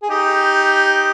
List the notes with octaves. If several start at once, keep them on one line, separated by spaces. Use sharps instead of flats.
G#4
D#4 G4